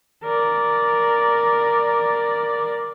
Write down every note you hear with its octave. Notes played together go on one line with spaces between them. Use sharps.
A#4 D5